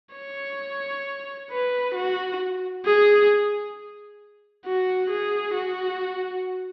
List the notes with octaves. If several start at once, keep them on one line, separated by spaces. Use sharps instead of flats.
C#5
B4
F#4
G#4
F#4
G#4
F#4